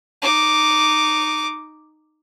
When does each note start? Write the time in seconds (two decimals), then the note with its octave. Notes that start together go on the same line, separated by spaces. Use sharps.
0.22 D#4 D6